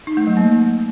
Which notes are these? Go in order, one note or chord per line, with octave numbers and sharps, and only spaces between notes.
D#4
A3
F#3
A#3